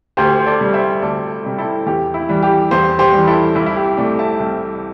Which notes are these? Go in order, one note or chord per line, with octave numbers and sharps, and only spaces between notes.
D2 G4 C5
C5
A4 D5
C3 G3
C5 E5
D2 A4 D5
C3 G3
E4 A4
E2 G4
E4
E3 G3
G4
E2 G4 C5
G4 C5
E3 G3
E4 A4
C2 E4
E4
G4
C3 A3 D5 G5
E5 A5
C2